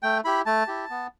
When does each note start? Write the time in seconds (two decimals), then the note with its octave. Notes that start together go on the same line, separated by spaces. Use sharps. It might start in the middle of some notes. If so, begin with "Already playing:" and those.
0.03 A3 G5
0.25 E4 G4 B5
0.46 A3 A5
0.67 E4 G4
0.90 B3